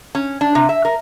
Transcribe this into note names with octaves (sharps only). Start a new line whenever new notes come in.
C#4
D4
C3
E5
A#4